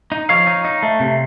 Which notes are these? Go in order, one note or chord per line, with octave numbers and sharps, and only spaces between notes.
D#4
F3 C#5 F5
D#4
D#4
A3
C3